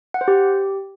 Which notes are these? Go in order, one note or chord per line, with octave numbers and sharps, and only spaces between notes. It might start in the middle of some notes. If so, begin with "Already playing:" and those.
F#5
C5
G4